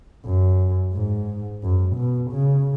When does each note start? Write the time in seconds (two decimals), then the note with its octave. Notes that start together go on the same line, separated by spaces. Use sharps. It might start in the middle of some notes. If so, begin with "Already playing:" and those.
0.25 F#2
0.93 G#2
1.63 F#2
1.96 B2
2.31 C#3